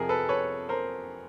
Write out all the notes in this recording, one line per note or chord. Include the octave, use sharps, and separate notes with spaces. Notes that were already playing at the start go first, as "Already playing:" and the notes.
Already playing: F2 C3 F3 G#4 A#4
A4 B4
B4 C#5
A#4 C5